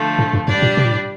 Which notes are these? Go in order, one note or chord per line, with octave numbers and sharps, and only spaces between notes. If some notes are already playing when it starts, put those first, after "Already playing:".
Already playing: D3 F3 A3
A2
G2
G2 G3 D4 G4 D5
A#2
C3
A#2
A2